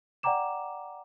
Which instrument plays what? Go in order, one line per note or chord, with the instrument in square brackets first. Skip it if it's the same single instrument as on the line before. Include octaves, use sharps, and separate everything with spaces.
[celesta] D5 F#5 G5 A#5 D6 E7